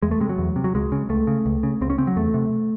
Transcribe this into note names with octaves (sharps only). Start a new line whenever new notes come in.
E2 G#3
A3
C3 G#3
F#3
E2
C3
F#3
C#2 G#3
C#3
C#2 A3
C#3
C#2
C#3
C#2 C4
C#4
C#3 C4
F#3
E2 A3
C3